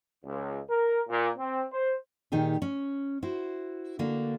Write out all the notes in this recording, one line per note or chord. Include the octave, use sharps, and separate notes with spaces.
C#2
A#4
A#2
C4
C5
A#2 D#3 D#4 G4 G#4
C#4
E4 F#4 C5
D3 A#3 D4 F#4